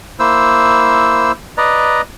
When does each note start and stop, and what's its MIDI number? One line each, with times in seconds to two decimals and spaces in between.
0.19 1.32 58
0.19 1.32 64
0.19 1.32 72
0.19 1.32 88
1.58 2.01 71
1.58 2.01 74
1.58 2.01 75
1.58 2.01 82